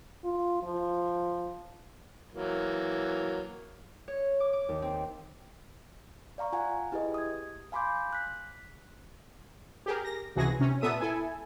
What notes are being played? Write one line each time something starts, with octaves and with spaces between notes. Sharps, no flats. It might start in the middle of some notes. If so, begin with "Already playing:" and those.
F4
F3
E3 F#3 A#3
C#5
D6
D6
D#2
C4
D5 F5 A#5 C#6
F4 F#5 G#5
E4 G4 G#4 B4 D#5
D#6 G#6
F5 G#5 B5 C6 D6 G6
F#6 B6
G4 G#4 A#4
A#6
C#2 C3 E3 F#4 G#4 A#6
C3 C#4
A#2 B3 A4 E5 D#6 D#7
E4 A4 G#5